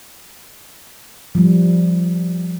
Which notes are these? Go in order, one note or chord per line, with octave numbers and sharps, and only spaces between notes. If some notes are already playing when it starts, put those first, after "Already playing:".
F3 G3